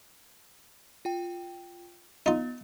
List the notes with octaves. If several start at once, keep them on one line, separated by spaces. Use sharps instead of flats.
F4 G5
B3 D#4 F4